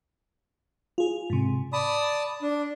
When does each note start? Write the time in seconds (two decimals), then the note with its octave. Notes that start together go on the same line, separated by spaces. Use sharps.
0.98 F4 G#4
1.30 G#2 C3
1.73 D5 A5 B5 D#6
2.42 D4